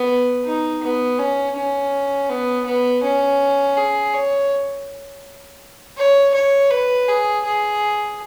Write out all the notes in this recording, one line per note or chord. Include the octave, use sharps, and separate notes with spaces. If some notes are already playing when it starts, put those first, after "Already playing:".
Already playing: B3
D#4
B3
C#4
C#4
B3
B3
C#4
G#4
C#5
C#5
C#5
B4
G#4
G#4